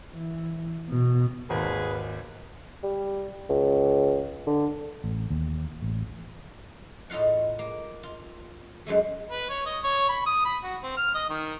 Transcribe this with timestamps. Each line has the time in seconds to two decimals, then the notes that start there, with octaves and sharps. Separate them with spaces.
0.14 E3
0.90 B2
1.50 G#1 D#2 G#4 B4
2.83 G3
3.50 C#2
4.47 D3
5.04 A1
5.30 D#2
5.82 A1
7.10 A2 D#4 F4 F5 F#5
7.59 A#3
8.03 F4
8.86 F#2 G#3 A3
9.31 B4
9.49 C#5
9.66 D#5
9.84 C#5
10.09 B5
10.26 D#6
10.45 B5
10.64 F#4
10.83 C4
10.97 F6
11.14 D#5
11.30 D#3